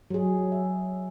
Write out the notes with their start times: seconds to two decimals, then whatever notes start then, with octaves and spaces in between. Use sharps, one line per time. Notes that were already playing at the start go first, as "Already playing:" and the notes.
0.10 F#3 G#4
0.52 E5